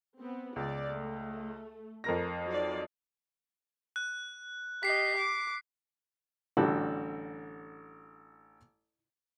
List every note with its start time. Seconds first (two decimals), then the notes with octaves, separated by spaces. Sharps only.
0.18 B3 C4
0.56 C#2 D5
0.89 A3
2.04 F2 A#4 A#6
2.47 F#3 D#4 D5
3.96 F#6
4.83 G4 D#5 B6 C7
5.17 D6
6.57 A1 D3 G3 F#4 A4 F#5